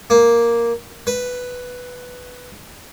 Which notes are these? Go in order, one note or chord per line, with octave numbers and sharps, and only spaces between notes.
A#3
B4